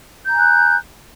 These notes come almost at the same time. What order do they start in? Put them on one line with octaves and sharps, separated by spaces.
G6 A#5 G#5 F#6